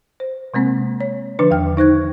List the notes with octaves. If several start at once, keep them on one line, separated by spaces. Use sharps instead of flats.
C5
C3 G#3 A#3 C4
C#5
D3 F3 D4 B4
E2 D#3 G5 F6
D#4 C5 F#6 G#6